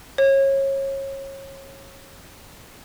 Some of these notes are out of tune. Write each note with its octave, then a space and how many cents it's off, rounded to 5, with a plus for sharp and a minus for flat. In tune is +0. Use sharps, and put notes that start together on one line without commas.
C#5 -25